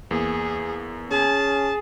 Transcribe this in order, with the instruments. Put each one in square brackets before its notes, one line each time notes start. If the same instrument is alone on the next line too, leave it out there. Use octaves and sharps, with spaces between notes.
[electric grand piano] E2 A#3 [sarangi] G#4
[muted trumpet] C#4 [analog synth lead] G#4 [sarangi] A5